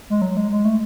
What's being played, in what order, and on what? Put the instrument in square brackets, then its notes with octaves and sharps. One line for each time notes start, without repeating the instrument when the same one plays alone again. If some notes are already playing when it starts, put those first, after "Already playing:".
[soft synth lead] G#3
F#3
G#3
G#3
A3